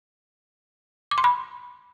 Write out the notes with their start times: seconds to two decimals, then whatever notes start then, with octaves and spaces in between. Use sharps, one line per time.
1.11 D6
1.18 C6
1.24 B5